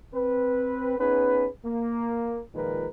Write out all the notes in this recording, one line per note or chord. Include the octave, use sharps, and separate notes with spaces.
C4 B4
B3 C#4 D#4 G#4 B4
A#3
A#2 D#3 F3 G#3 A#4 B4